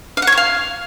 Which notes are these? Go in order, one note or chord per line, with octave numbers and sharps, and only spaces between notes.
F5
F#5
C#5
C#6
F5